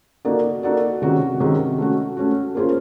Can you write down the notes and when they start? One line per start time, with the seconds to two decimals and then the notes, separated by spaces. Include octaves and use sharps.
0.25 A#3 D#4 F#4 A4 D5
0.63 A#3 D#4 F#4 A4 D5
1.02 C3 D#3 G#3 C#4 F#4
1.40 C3 D#3 G#3 C#4 F#4
1.78 A3 C#4 F#4
2.17 A3 C#4 F#4
2.55 A#3 C#4 F4 G#4 C5